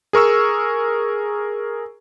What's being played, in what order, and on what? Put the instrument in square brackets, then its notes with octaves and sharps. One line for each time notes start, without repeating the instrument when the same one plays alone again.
[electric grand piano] G#4 A#4 C#6 E6